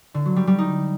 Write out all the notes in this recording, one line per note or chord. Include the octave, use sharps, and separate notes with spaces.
D3
F#3
G3
G3
D#4